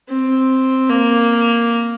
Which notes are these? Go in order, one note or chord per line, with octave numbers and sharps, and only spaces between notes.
C4
A#3